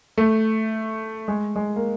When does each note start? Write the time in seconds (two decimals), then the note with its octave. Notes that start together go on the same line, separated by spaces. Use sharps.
0.18 A3
1.28 G#3
1.56 G#3
1.76 A#3